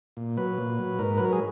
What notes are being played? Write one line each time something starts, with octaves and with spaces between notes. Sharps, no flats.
A#2
F#3 B4
A#2
F#3
G#2 A#4
F#3 B4
A#4
G#4